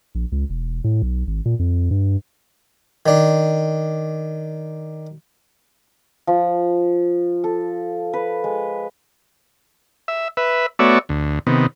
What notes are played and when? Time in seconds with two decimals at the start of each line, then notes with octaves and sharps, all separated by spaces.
0.15 A#1
0.32 C#2
0.50 E1
0.84 A2
1.02 B1
1.27 G#1
1.46 A#2
1.59 F2
1.91 G2
3.06 D#3 D4
6.27 F3
7.44 A4
8.13 B4
8.44 G#3
10.08 E5
10.37 B4 E5
10.79 A3 B3 F#4 C#5 D5 E5
11.09 D2
11.47 C3 D#3 B3